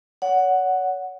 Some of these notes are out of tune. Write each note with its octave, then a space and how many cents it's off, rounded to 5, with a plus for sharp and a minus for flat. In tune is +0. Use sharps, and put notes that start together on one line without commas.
C#5 +40 F#5 +0